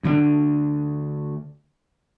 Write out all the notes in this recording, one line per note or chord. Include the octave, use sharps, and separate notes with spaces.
D2 D3 C4 D4